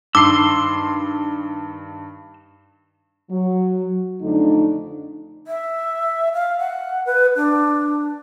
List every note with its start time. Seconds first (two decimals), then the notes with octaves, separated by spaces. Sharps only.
0.15 G2 D#3 C6 D6 E6 C7
3.31 F#3
4.21 F2 D3 A3 D4 D#4
5.47 E5
6.34 F5
6.58 F#5
7.06 B4
7.36 D4